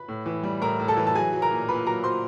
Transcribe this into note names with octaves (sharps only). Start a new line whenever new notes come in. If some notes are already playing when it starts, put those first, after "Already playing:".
Already playing: B4 B5
A2
E3
G3
A2 A#4 A#5
A2
A4 A5
E3
A5
F#3 G#4 G#5
F#3
A#4 A#5
A#2
A#2 B4 B5
F#3 A#4 A#5
F#3 C5 C6